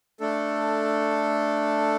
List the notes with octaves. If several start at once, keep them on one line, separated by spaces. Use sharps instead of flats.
A3 D4 A4